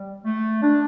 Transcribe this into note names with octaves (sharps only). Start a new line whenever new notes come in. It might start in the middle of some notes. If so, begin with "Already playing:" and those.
Already playing: G3
A3
D4